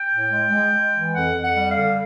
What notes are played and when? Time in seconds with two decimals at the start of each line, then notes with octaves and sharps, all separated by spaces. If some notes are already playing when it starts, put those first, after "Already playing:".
Already playing: G5
0.09 A2
0.31 G#3
0.51 G#3
0.73 G#3
0.93 E3
1.13 F2 F#5
1.35 F2
1.42 F#5
1.55 G3
1.69 F5
1.77 D3